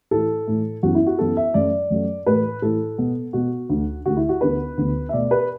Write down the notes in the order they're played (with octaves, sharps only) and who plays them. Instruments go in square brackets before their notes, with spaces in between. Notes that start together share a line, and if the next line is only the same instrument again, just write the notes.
[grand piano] A2 E3 A3 A4
A2 E3 A3
F#2 E3 B3 F#4
E4
F#4
F#2 E3 B3 A4
E5
F#2 F#3 A3 D5
F#2 F#3 A3
A2 E3 A3 B4
A2 E3 A3 A4
B2 B3
B2 B3 F#4
D2 D3 A3
D2 D3 A3 F#4
E4
F#4
D2 D3 B3 B4
D2 D3 B3
E5
B2 A3 D5
B4